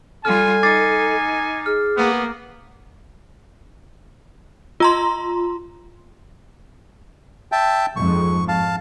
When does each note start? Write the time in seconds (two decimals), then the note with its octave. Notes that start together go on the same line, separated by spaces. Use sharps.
0.25 G3 F4 A4 G#5 F6
0.63 D#4 D6 A6 C7
1.66 G#4 F6
1.97 A#3 B3
4.80 F4 A#5 C6
7.52 E5 G5 A5
7.96 F2 G#2 C#6
8.48 F5 A5